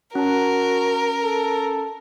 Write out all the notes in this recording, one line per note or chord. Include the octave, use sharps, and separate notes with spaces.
C#4 F#4 A#4 A5
A4